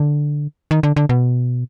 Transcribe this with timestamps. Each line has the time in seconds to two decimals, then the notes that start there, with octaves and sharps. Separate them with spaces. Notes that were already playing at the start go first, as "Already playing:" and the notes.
Already playing: D3
0.71 D#3
0.83 D3
0.96 D3
1.09 B2